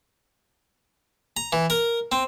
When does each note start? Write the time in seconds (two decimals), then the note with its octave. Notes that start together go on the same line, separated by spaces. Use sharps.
1.37 A#5
1.53 E3
1.70 A#4
2.12 C4